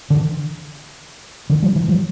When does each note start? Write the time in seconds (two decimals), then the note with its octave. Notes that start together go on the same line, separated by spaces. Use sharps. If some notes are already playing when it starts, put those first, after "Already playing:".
0.10 D3 E3
1.50 D3 E3
1.62 F3 G3
1.76 E3 F#3
1.88 F3 G3